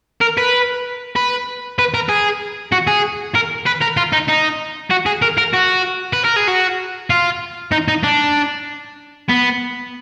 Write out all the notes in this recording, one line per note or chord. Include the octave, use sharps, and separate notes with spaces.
A#4
B4
B4
B4
A#4
G#4
F#4
G#4
A#4
B4
A#4
F4
D#4
D#4
F#4
G#4
A#4
A#4
F#4
B4
A#4
G#4
F#4
F4
D#4
D#4
D4
B3